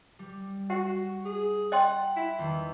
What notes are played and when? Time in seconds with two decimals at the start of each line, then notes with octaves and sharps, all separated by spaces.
0.19 G3
0.70 F#4 F#5
1.25 G#4
1.72 D#5 F#5 G5 C6
2.16 E4
2.38 E2 D#3